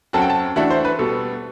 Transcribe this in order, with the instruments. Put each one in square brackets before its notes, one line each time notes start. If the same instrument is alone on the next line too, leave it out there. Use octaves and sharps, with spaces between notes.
[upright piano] F#2 F#3 C4 F#4 A4 [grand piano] A5
[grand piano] G5
A5
[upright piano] E3 A3 D4 F#4 A4 [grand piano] E5
[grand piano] C5
B4
[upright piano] B2 G3 B3 [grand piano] A4